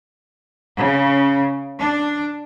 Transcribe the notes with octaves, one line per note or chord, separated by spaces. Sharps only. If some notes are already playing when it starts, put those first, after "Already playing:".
C#3
D4